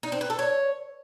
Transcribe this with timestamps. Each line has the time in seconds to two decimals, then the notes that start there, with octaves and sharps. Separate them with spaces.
0.03 D#4
0.12 C4
0.21 B4
0.30 A4
0.39 C#5